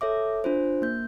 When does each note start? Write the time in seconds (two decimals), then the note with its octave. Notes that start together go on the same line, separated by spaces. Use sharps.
0.01 A4 C#5 E5 D6
0.44 D4 F4 C5
0.82 A#3 G6